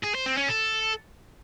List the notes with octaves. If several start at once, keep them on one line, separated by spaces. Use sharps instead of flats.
G#4
C5
C4
C#4
A4